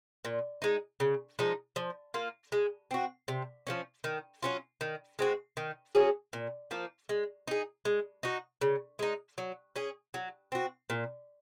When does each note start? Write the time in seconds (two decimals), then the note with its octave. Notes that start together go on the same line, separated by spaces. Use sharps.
0.25 A#2
0.62 G#3 D#4
1.00 C#3
1.39 F3 G#3 D#4
1.76 F3
2.14 A#3 F4
2.52 G#3
2.91 C4 F#4
3.28 C3
3.67 F3 A#3 C#4
4.04 D#3
4.43 F#3 C#4 F4
4.81 D#3
5.19 G#3 C4 F#4
5.57 D#3
5.95 F#3 C#4 G#4
6.33 A#2
6.71 F3 A#3
7.09 G#3
7.48 D#4 G#4
7.85 G#3
8.23 D#4 F#4
8.61 C#3
8.99 G#3 D#4
9.38 F#3
9.76 C#4 G#4
10.14 F#3
10.52 C4 F#4
10.90 A#2